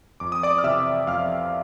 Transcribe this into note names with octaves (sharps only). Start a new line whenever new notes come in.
F2 D6
D#6
D5 D6
F6
C3 E3 E5 E6
F2 F5 F6